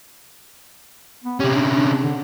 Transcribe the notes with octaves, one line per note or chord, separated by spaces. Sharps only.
B3
C3 C#4 G4
D4
D4
D3